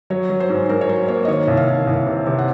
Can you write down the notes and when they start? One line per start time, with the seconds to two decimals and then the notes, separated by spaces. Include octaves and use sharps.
0.10 F#3 C#5
0.30 F#3
0.40 C5
0.50 G#2
0.69 G#2 A#4
0.81 C#5
0.89 F#3 C5
1.08 A#3 C#5
1.25 D#5
1.28 D#3 C#5
1.48 C2
1.57 F5
1.68 C2
1.87 C2
2.06 C3
2.27 C3
2.38 F#5